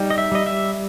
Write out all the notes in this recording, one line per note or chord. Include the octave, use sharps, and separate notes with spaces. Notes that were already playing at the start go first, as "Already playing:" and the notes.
Already playing: G3 D#4
D#5
E5
G3 D#5
E5